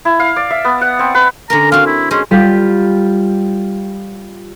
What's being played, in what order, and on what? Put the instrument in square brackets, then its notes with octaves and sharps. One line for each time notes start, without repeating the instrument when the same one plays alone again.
[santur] E4
F5
D5
E5
B3
F#5
C4
B4
[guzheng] D3 C#4 A#4 [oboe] A#5
[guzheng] C4 F#4 [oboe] F5
[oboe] E4
[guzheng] G#3 C5 [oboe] C#4
[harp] G3 F4 G4